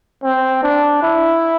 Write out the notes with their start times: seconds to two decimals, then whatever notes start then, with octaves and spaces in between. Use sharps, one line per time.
0.23 C4
0.63 D4
1.03 E4